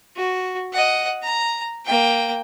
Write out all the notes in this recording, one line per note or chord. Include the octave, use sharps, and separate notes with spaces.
F#4
D#5 F#5
A#5
A#3 G5